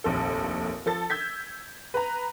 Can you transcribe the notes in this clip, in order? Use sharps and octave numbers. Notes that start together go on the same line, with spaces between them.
F1 A#1 D#2 A4
F3 A4 A6
E6 G6 G#6 B6
B4 A#5